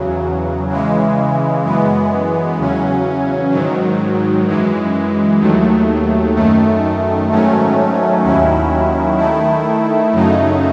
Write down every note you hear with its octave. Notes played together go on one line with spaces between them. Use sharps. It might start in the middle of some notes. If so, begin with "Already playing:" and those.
Already playing: E2 C#3 F#3
C#3 E3 G#3
F#2 E3 G#3 B3
E2 C#3 F#3 C#4
G#2 D#3 F#3
F#2 E3 G#3
D#2 D#3 F#3 A3
F#2 D#3 A3
G#2 D#3 F#3 A3 C#4
D#2 D#3 F#3 C#4 E4
D#3 A3 E4
F#2 C#3 F#3 A3 D#4